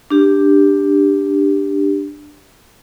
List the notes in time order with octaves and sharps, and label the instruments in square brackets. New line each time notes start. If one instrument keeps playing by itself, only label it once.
[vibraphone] D4 G4